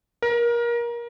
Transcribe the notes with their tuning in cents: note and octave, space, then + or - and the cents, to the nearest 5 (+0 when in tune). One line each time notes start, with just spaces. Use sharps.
A#4 +25